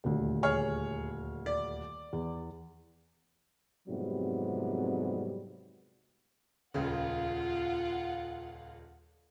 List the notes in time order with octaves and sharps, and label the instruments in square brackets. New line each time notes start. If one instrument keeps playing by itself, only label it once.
[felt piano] D#1 D2
[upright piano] G#4 C#5 F6
D5
[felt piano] E2
[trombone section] F2 G#2 C3 F#3 G3 B3
[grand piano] D#1 C#2 C#3 [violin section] F4 F#5